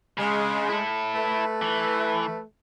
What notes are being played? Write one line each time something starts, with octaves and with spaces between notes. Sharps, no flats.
C#3 G#3
E4 A4
A3 B4
E3